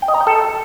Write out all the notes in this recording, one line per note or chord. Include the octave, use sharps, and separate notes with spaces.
G5
D#5
A#5
G5
A4